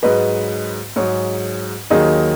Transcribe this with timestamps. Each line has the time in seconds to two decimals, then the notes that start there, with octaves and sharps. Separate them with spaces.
0.03 G#2 F#3 B4 D#5
0.96 G#2 F#3 G#4 C#5
1.90 D#2 D#3 F#3 D#4 G#4